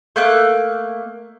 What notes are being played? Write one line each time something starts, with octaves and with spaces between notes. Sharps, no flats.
A3 A#3 F#6